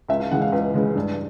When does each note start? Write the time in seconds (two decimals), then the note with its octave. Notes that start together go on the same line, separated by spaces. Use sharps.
0.09 C#2 E5
0.20 F5
0.31 C#3 E3 G#3 F#5
0.42 F5
0.52 C#2 B4
0.74 C#3 E3 G#3
0.95 G2